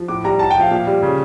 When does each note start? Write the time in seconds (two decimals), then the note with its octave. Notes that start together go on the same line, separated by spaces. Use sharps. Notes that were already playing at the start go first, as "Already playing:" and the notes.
Already playing: F3
0.08 A2 D6
0.24 G3 A#5
0.39 A2 A5
0.51 G5
0.56 F3 F5
0.71 A#2
0.87 G3
1.03 C#3